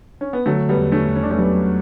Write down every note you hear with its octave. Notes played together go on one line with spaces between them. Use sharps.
C#4
B3
D3 F#3 A3
G3 B3
E2
A3 C#4
E2
C#4
D4
A3 C#4
F#3 G3 B3